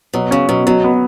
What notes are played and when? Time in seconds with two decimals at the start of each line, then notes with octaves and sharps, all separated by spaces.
0.13 B2 F#3
0.31 C#3 C#4
0.49 B2 F#3
0.66 B2 F#3
0.84 B3